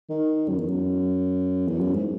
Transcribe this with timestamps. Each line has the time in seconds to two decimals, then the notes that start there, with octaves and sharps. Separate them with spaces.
0.10 D#3
0.49 F#2
0.58 E2
0.68 F#2
1.68 E2
1.81 F#2
1.94 G#2